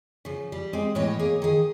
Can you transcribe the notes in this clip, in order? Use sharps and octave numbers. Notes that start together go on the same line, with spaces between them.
C#3 F3
G3
G#3 C4
A2 E3 C#5 D#5
A#3 G#4 C#5
D#3 G#4